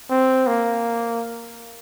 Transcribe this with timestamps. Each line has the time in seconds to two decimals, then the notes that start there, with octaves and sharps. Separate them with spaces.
0.10 C4
0.47 A#3